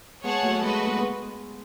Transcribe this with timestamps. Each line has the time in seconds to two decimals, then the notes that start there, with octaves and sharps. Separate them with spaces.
0.24 G#3 B3 G#4 C#5 F#5 A5
0.43 F#3 A3
0.61 G#3 F#4 B4 D#5
0.86 G#3 B3
0.99 G#3 B3